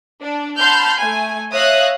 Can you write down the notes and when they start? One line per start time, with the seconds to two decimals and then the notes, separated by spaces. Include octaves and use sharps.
0.22 D4
0.59 F#5 A5 B5 C6 F6 G6
1.00 A3 G#5
1.54 C#5 E5 F5 D#6 F#6 A#6